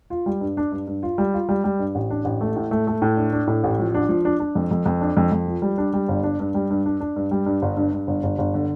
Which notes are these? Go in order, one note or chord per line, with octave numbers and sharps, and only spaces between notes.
F4
G3
G2
D4
G2
G2
F4
G3
F4
G3
G3
G2
A1
D4
A1
A3
A2
A3
A3
A2
D4
D4
A2
A1
F3
D4
F3
D4
D4
F2
F2
F2
D4
F2
F2
F3
G3
D4
G3
G1
D4
G2
G3
G2
D4
D4
G2
G3
G2
G1
G2
G2
G1
G1
G1
D3